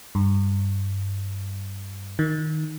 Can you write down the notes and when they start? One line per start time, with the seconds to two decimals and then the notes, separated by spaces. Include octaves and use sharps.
0.15 G2
2.19 D#3